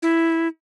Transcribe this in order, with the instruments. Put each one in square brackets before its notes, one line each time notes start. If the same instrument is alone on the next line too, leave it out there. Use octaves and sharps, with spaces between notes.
[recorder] E4